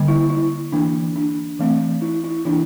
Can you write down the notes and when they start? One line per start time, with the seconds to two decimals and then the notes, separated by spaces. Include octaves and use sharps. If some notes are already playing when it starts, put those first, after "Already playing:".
Already playing: D3 G3 A#3
0.08 E4
0.30 E4
0.72 E3 A#3 D4
1.16 D4
1.59 E3 A3 C4
2.02 E4
2.24 E4
2.45 E3 A#3 D4 E4